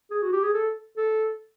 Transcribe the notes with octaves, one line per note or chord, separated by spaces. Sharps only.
G#4
F#4
G4
G#4
A4
A4